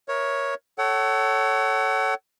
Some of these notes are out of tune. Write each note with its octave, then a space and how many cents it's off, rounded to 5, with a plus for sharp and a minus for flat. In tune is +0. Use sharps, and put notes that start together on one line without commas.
A#4 +20 C#5 +0 E5 -10
A4 +0 C#5 +0 F#5 +35